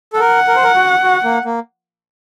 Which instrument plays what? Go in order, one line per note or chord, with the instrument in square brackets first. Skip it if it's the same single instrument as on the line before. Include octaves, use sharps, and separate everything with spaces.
[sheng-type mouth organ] A4
[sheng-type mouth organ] A#4 [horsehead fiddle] F#5
[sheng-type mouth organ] A#4
C5
A#4
F#4
F#4
A#3
A#3